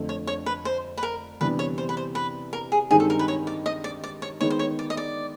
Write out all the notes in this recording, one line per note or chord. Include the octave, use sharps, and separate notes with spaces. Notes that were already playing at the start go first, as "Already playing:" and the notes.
Already playing: F2 D3 F3 A3 D4
C#5
C#5
B4
C5
B4
A#4
C3 E3 G3 B3 D4 B4
C#5
C5
B4
C5
B4
A#4
G#4
G2 D#3 G#3 C4 D#4 G#4
A4
A#4
B4
C#5
D5
D#5
D5
D5
C#5
D#3 G#3 B3 D#4 C#5
C5
C#5
D5
D#5
D5